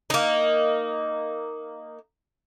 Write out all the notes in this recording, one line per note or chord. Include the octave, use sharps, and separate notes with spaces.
A#3 D#4